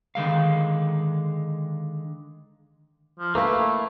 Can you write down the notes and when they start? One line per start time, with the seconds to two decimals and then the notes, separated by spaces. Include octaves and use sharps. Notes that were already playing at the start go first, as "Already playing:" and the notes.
0.15 D3 D#3 G#3 F5
3.19 F3
3.35 A3 A#3 E4 A#4 B4 F5